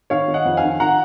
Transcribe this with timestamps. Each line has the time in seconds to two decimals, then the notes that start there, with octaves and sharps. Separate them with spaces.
0.10 D#3 C#5 F5
0.28 D#3
0.34 D#5 F#5
0.45 F2
0.57 F5 G#5
0.63 D#3
0.80 D#3 F#5 A#5